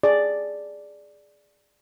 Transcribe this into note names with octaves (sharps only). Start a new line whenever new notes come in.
G#4 D5